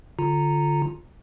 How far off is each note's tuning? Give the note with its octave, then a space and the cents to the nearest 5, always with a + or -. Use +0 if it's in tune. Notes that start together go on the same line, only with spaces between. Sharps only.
D3 +0 F4 +0 A#5 -10